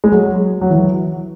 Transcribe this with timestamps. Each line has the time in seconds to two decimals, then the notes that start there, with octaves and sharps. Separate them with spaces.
0.04 G#3
0.12 F#3
0.61 F#3
0.70 E3